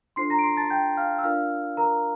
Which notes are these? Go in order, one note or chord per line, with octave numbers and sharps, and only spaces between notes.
D4 F4 A4 C5 C6 C7
A#5 A#6
D7
C6 C7
A5 A6
G5 G6
F5 F6
E6
D4 F4 A#4 D5 F5 F6
A#4 A#5